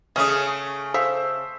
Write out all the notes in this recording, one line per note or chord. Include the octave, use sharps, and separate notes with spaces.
C#3 A3 C#4 G#4 D#5
A4 C5 E5 F5 E6 B6